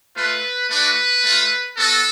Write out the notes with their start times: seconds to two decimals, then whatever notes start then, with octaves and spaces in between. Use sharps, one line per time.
0.16 A3 F4 B4
0.69 A3 D4 F#4 B4
1.24 A3 F4
1.77 B3 F#4 A4